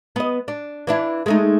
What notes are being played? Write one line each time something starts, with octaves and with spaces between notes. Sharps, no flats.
B3 D#5
D4
E3 D4 E4
G#3 A3 D#4